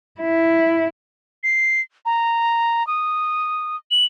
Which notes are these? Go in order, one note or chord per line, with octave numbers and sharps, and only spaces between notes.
E4
C7
A#5
D#6
F#7